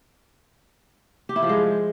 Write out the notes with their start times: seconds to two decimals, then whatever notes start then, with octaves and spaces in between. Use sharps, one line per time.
1.29 G4
1.36 E4
1.43 F3
1.49 G#3